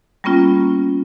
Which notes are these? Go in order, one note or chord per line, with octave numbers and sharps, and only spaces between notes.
G3 A#3 B3 C#4 F4